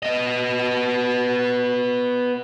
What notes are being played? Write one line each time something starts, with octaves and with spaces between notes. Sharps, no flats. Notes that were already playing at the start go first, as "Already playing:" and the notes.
B3 D#5